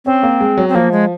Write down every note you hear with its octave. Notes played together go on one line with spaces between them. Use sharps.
C4 C#4
A#3
G#3
F#3
C4
F3 A#3
G#3